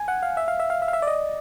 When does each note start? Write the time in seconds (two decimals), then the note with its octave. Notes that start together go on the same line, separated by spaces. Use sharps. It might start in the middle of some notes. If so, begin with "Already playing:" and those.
Already playing: G#5
0.08 F#5
0.23 F5
0.37 E5
0.48 F5
0.60 E5
0.70 F5
0.82 E5
0.88 F5
0.93 E5
1.02 D5
1.07 D#5